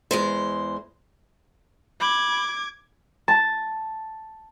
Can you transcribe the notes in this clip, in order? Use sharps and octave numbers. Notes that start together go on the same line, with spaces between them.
E2 G#3 C5
B5 D6 G#6
A5